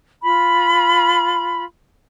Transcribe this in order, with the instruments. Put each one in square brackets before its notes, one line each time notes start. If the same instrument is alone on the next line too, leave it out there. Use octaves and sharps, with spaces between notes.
[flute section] F4 B5